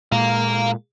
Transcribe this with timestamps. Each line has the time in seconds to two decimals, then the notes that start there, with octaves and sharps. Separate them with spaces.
0.12 A#2 G#3 F5 A#5